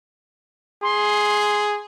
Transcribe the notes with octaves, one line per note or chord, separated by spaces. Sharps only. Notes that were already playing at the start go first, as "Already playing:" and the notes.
G#4 C6